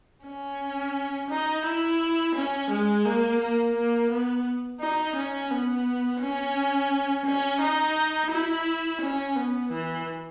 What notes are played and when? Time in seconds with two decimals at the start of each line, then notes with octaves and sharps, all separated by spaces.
0.25 C#4
1.30 D#4
1.65 E4
2.35 C#4
2.70 G#3
3.05 A#3
3.40 A#3
3.75 A#3
4.10 B3
4.80 D#4
5.16 C#4
5.51 B3
6.21 C#4
7.26 C#4
7.61 D#4
8.31 E4
9.01 C#4
9.36 B3
9.71 E3